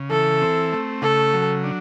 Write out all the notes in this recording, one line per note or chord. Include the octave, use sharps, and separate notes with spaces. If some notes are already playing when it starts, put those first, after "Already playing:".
Already playing: C#3
E3 A4
C4
A3
C#3 A4
F#3
D4